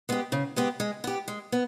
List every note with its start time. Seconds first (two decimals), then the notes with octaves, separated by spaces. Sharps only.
0.09 G#3 B3 G4
0.32 C#3
0.56 G#3 B3 G4
0.80 G#3
1.04 B3 G4
1.28 G#3
1.52 B3